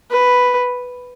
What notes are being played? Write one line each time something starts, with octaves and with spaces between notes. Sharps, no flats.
B4